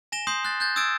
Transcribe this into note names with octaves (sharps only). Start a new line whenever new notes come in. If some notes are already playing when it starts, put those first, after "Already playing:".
G#5 A#6 E7 G7
C6 D#6 G6 C7
F#6 A6
F#6 G6 A6
D#6 E6 G#6 A6 D7 E7